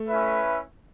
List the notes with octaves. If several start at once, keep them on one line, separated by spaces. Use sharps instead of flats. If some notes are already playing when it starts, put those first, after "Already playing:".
Already playing: A3
C#4 E4 B4 E5